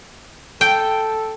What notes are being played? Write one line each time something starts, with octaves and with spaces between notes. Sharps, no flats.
A4 G5